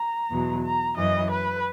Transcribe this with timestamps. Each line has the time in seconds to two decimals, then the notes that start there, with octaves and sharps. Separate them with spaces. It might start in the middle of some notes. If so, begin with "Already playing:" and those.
Already playing: A#5
0.31 E2 B2 F#3
0.63 A#5
0.97 F#2 E3 D#5
1.30 B4